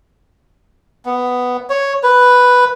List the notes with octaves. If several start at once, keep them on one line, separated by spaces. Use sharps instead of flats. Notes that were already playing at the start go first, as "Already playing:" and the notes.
B3
C#5
B4